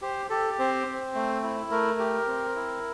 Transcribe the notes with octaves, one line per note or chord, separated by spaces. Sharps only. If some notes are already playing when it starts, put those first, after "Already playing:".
G4 C5
G4 A4
C4 C5
C4
A3
E4
A3 A#4
G4
C4
E4